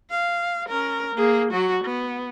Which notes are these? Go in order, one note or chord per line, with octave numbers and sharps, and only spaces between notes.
F5
C#4 A#4
A#3 G#4
F#3 F#4
B3